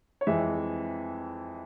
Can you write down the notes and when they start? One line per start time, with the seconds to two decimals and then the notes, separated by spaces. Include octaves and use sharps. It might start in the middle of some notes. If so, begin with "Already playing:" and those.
0.21 C#5
0.27 F2 E3 G#3 C4 E5